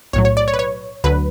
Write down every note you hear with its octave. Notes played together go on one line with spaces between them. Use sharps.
B1 A2 F#3 C#5
C#5
D5
C#5
B4
C#5
D2 D3 F#3 B4